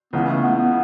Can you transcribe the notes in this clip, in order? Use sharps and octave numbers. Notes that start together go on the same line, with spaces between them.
C#2 C#3 E3 B3
A3
B3
B3